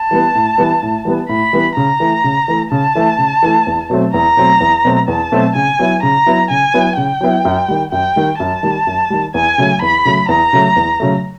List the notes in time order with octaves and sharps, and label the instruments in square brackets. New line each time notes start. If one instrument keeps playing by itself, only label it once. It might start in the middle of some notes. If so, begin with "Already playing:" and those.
Already playing: [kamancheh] A5
[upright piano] E3 G3 B3
A2
E3 G3 B3
A2
E3 G3 B3
[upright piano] A2 [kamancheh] B5
[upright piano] E3 G3 B3
[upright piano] C#3 [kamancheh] A#5
[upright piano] E3 A3
C#3
E3 A3
[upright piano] C#3 [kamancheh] A5
[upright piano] E3 A3
C#3
E3 A3
E2
B2 F#3 A3 C4
[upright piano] E2 [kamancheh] A#5
[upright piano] B2 F#3 A3 C4
E2
B2 F#3 A3 C4
[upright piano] E2 [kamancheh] A5
[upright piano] B2 F#3 A3 C4
[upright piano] C#3 [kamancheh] G#5
[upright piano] F#3 B3 E4
[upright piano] C#3 [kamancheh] A#5
[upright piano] F#3 B3 E4
[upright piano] C#3 [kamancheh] G#5
[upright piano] F#3 B3 E4
[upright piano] C#3 [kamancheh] G5
[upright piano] F#3 B3 E4
F#2
D#3 G3
[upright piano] F#2 [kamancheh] G5
[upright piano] D#3 G3
[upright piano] F#2 [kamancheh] A5
[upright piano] D#3 G3
F#2
D#3 G3
[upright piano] E2 [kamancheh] G#5
[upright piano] C#3 F#3 A3
[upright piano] E2 [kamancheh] B5
[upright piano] C#3 F#3 A3
[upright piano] E2 [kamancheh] A#5
[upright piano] C#3 F#3 A3
E2
C#3 F#3 A3